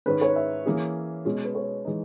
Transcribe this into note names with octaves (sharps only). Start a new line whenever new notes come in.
G#2 D#3 G#3 C#4 B4
C#5
E5
E3 A#3 C#4 G#4
B2 G#3 C#4
B4
C#5
E3 G#3 D#4